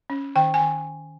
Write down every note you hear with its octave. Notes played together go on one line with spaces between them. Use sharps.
C#4
D#3 G5
G#5
D#3